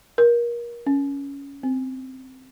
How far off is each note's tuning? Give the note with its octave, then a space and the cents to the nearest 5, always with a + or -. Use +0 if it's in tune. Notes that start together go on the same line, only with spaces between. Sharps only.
A#4 +25
C#4 +10
C4 -5